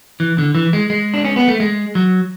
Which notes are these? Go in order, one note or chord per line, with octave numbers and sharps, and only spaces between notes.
E3
D3
E3
G#3
G#3
D4
C#4
B3
A3
G#3
F#3